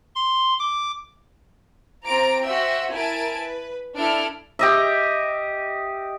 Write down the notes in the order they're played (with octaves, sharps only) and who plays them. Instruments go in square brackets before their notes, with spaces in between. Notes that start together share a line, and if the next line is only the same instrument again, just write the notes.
[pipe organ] C6
D6
[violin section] C4 F4 C5 A#5 D6 D7
F#4 C5 E5 G5 C6 E6
E4 A#4 G#5 A5 D7
B4
D4 E4 A4 F6 D7
[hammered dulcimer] G4 D#5 E5